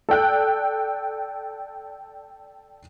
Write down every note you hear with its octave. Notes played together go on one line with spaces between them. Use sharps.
A4 D5 G5 F#6